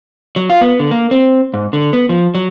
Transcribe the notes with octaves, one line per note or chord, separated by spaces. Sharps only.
F#3
F4
B3
D3
A#3
C4
G#2
D3
B3
F3
F#3